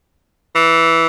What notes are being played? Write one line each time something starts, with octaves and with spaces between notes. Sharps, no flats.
E3